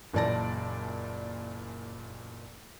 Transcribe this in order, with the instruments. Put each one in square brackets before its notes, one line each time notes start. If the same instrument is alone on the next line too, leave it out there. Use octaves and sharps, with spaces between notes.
[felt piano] F#1 A#2 E3 D5 A5 A#6